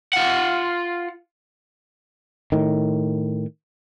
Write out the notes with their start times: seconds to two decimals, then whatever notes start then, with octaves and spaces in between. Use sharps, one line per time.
0.13 F4 F#5
2.52 A2 D#3